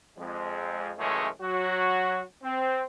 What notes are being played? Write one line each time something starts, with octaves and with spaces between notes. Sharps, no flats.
F2 G#3
C#2 F#2 E3 G#3 A3 C#4
F#3 F#4
C4